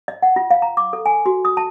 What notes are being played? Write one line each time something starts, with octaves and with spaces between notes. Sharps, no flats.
D#5
F#5
F4
F5
A#5
D6
A4
G#5
F#4
D#6
A5